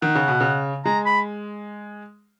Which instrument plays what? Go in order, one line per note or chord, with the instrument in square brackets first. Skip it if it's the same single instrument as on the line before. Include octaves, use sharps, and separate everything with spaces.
[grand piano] D#3 [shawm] F#5
[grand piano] C#3
B2
C#3
[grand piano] G#3 [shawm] A#5
[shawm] B5